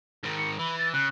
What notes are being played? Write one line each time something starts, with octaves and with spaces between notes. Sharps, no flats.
G#2 D#3
C#7
E3 B5
A6
C#3 F#6